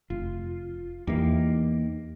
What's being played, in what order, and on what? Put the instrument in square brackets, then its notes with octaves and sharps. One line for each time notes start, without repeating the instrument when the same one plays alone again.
[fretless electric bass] F1 [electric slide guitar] F4
[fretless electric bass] E2 E3 [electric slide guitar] A#3 D#4 G4